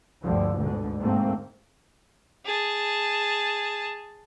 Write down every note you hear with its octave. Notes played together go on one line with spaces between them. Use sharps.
G1 D2 G2 D3 F3
D2 G#2 B2 D3
G#2 A3 A#3 C4
G#4 A5